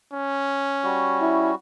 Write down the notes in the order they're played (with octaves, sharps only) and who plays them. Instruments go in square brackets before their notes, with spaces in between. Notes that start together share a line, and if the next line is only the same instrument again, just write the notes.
[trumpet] C#4
[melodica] G3 F#4
[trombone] E4